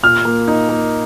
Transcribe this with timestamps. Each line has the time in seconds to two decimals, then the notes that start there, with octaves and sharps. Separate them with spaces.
0.03 A#2 F6
0.25 A#3
0.48 D#4
0.69 A#3